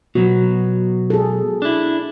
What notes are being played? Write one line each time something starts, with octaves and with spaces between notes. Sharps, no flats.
B2 F#3 F#4
G#4 A4
D4 E4